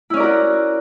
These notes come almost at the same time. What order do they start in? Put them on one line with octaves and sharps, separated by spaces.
E4 C#4 D5 A#4 F#4